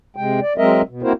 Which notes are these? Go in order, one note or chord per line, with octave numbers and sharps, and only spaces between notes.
C3 G#3 G5
D5
F#3 G#3 C4 A#4 D#5 E5
B2
A#3 C4 E4 F#4 A#4 C5